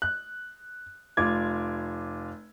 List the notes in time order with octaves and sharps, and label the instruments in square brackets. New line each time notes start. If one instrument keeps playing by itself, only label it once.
[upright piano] F#6
F1 F4 D6 G#6